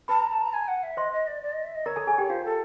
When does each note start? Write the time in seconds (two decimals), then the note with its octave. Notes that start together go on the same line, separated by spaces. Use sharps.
0.08 B4 A5 B5
0.20 A#5
0.31 A5
0.42 A#5
0.53 G#5
0.67 F#5
0.83 E5
0.97 C5 D#5 C6
1.12 D#5
1.27 D5
1.42 D5
1.52 D#5
1.63 E5
1.74 D#5
1.86 A#4 C#5 A#5
1.96 A4 A5
2.07 G#4 G#5
2.18 G4 G5
2.29 F4 C5 F5
2.44 A4